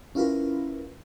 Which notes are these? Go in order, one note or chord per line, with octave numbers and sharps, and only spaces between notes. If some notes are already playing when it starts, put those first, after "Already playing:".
C#4 E4 F4 A#4 B4